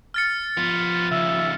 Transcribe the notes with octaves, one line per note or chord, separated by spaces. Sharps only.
F6 A6 C#7
F3 B3 F4
D#2 C#3 E5